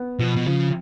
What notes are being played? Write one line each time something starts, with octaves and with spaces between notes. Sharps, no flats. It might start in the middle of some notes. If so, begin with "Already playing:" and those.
Already playing: B3
B2 F3
B2
C#3 F3